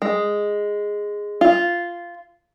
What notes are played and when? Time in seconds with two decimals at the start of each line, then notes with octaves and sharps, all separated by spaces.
0.02 G#3
1.41 F4